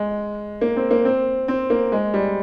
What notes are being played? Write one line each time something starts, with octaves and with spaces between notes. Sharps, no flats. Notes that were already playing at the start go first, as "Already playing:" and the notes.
Already playing: G#3
A#3
C4
A#3
C4
C4
A#3
G#3
G3